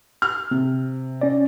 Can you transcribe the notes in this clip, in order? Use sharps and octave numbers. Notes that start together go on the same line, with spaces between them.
F6
C3
C#4 D5